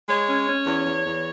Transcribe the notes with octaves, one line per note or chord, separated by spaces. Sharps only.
G#3 C#5
C#4
C#4
E2
E2
E2